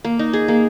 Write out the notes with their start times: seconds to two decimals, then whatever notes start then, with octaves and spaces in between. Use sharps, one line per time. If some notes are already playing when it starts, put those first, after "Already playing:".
0.04 A#3
0.19 D#4
0.33 G#4
0.48 A#3